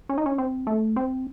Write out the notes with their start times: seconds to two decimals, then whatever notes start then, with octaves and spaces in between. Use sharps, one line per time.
0.09 C#4
0.18 D#4
0.26 C#4
0.38 C4
0.67 A3
0.96 C4